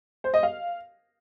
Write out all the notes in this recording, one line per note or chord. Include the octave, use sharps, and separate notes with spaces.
C5
D#5
F5